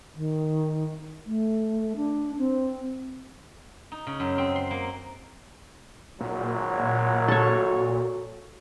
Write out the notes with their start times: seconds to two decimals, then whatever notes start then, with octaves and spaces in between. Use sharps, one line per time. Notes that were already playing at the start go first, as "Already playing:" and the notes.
0.15 D#3
1.26 A3
1.97 D4
2.39 C4
3.92 D#4
4.07 C#3
4.20 F#2
4.38 C4
4.56 C6
4.71 A#3
6.21 G#1 A#2 F#3
7.28 F#4 A4 C#5